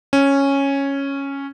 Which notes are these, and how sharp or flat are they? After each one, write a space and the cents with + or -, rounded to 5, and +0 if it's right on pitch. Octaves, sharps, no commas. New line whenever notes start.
C#4 -5